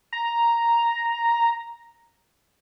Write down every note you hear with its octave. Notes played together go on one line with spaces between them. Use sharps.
A#5